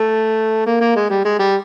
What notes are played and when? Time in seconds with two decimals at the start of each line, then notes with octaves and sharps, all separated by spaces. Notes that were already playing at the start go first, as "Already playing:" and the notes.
Already playing: A3
0.66 A#3
0.80 A#3
0.96 G#3
1.10 G3
1.24 G#3
1.39 G3